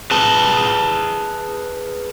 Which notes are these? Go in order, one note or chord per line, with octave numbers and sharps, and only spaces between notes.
G#4 B4 A5